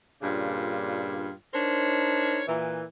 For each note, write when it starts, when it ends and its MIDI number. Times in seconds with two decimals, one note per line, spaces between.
0.22 1.31 43
0.22 1.31 46
0.22 1.31 49
0.22 1.31 62
0.22 1.31 65
1.54 2.42 62
1.54 2.42 63
1.54 2.42 70
1.54 2.42 72
1.54 2.42 73
2.47 2.84 46
2.47 2.84 52